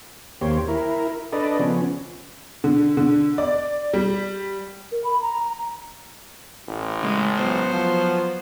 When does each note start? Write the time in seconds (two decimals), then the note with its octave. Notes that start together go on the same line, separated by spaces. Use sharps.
0.41 D#2 A#3 G4 C5 C#5
0.68 E4 A#4
1.33 D4 A4 B4 D5 D#5
1.59 C#3 F3 B3 C#4
2.64 D3
2.97 D3
3.38 D5
3.94 G3
4.92 A#4
5.04 B5
5.22 A#5
6.68 A1
7.01 C#3 G#3
7.36 F#3 B3 C5
7.71 F3